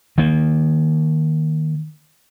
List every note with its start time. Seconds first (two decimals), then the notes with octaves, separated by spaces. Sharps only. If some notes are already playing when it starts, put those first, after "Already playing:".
0.18 D#3 A#3